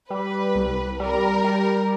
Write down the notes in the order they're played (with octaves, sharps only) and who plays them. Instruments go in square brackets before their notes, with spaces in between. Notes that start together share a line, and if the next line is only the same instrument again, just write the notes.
[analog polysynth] G3 [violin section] B4
[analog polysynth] C2
[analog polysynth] G3 [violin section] A#4
[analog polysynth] G3